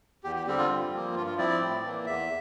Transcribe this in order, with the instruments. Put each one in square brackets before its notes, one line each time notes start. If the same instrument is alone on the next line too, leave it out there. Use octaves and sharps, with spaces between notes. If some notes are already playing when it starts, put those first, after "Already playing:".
[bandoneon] E2 G4
G4
D3 G3 C4 G4
F4
G2
F3 A#3
G2 F4
F4
F3 C4 E4 D5
D5
A2
E3 A#3
E2 E5